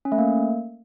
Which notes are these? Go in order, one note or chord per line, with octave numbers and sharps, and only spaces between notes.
C#4
A3
A#3